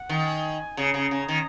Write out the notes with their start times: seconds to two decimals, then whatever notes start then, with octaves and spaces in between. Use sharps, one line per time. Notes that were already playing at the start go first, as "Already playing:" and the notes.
Already playing: F#5
0.09 D#3
0.26 G#5
0.77 C#3 A#5
0.94 C#3
1.11 C#3
1.28 D#3